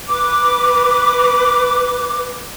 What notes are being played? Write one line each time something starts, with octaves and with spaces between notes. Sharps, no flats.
B4 D6